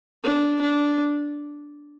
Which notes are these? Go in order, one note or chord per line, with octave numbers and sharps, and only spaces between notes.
D4
D4